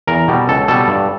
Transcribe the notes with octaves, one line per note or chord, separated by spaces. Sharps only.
E2 A#4
B2 G3
C#2 A4
B2 G3 A4
G2